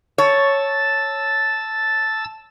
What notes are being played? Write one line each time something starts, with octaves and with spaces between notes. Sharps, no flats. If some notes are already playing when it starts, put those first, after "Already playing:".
C#5 A5 E6 A6